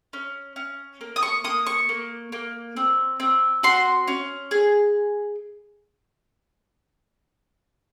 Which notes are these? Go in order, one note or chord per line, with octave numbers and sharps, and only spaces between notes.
C#4
C#4
A#3
D#6
C#6
A#3 D#6
C#6
A#3
A#3
C4
C4
F#4 C6
C#4
G#4